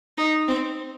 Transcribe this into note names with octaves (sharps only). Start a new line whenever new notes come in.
D#4
C4